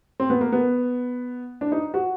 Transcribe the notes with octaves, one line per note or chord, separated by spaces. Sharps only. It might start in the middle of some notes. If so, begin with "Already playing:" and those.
C4
B3
A#3
B3
D4
D#4
F#4